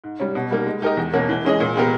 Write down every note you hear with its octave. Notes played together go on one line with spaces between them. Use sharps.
G#2
G3 C#4
B2
G3 A#3 D#4
G#3
D#4 G4 A#4 D#5
E2
B2 A#3 C#4
E3
G#3 C#4 G#4 D#5
A#2
G#3 B3 G4 A#4